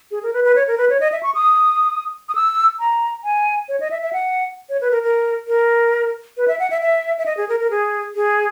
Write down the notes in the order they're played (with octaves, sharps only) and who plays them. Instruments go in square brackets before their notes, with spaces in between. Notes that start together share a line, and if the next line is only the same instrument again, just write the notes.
[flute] G#4
A#4
B4
B4
C#5
A#4
B4
C#5
D#5
E5
C#6
D#6
D#6
E6
A#5
G#5
C#5
D#5
E5
E5
F#5
C#5
B4
A#4
A#4
A#4
B4
E5
F#5
E5
E5
E5
D#5
G#4
A#4
A#4
G#4
G#4